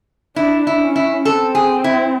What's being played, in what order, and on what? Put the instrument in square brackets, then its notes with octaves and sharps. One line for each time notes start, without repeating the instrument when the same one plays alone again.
[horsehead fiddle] D4 [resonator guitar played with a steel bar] E4
[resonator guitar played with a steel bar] E4
[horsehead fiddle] C#4
[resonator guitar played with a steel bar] E4
[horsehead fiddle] C4 [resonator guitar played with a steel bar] A4
[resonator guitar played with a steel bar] G#4
E4